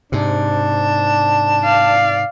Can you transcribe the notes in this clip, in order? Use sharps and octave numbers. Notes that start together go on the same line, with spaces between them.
G#2 C3 D4
D5 F5